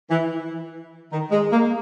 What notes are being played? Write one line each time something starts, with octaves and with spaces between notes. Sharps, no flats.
E3
D#3
G#3
A#3